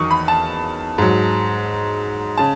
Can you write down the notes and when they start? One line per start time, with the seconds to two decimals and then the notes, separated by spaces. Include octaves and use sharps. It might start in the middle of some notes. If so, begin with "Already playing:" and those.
Already playing: E2 D#3 F#3 C#6 D#6
0.11 B5
0.28 A5
0.98 G#2 F#3
2.37 C#3 A5